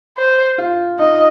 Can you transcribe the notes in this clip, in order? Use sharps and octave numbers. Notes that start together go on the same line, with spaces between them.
C5
F4
D#4 D#5